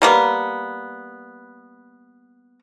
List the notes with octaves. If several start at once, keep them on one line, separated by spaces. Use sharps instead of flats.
G3 A#3 B3